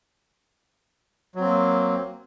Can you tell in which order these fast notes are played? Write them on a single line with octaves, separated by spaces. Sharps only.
F#3 C4 A#3